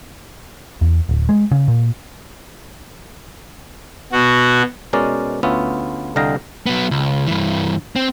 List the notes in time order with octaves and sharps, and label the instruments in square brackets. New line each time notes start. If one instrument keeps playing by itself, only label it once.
[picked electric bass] E2
D1
G#3
C#3
A#2
[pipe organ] B2 F#4
[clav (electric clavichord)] B2 G#3 C#4 A#4 D5
D2 B3 C#4 F4 E5
C2 D3 D#5 F5 G5 A#5
[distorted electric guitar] F#3 B3
C#2
G2 E3
C4